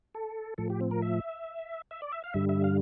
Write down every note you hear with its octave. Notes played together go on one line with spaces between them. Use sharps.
A4
A2 F3 A4
G4
C4
A#4
E5
E5
D5
E5
F5
G2 D3 G3 E5
E5
F5